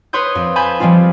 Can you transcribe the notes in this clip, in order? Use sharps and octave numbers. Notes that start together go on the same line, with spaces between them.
B4 C#5 C6 D#6 G6
F2
G#5 A5 B5 G6 G#6
F3 G3 G#3 C4 F4